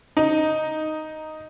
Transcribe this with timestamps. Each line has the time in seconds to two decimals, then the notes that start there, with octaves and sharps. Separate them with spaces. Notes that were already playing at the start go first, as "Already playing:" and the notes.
0.17 D#4